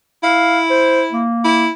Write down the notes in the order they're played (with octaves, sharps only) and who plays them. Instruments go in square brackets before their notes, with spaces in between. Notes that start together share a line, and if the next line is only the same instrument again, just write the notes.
[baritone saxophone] E4 [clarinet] F5
[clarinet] C5
A#3
[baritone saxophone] E4